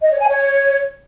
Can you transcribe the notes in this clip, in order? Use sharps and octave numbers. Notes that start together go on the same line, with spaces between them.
D#5
C#5
G#5
C#5